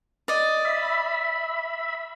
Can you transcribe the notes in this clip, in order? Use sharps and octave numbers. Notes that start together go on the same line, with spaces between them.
D5 D#5
E5 B5